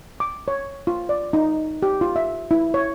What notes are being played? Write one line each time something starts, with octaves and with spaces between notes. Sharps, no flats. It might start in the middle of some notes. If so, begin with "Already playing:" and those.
D6
C#5
F4
D5
D#4
G4
F4
E5
E4
C#5